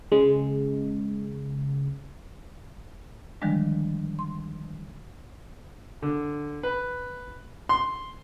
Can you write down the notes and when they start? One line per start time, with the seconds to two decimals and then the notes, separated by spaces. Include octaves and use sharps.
0.12 C#3 G#3
3.42 D3 D#3 F3 G3 G#3 D4
4.19 C6
6.02 D3
6.63 B4
7.69 C6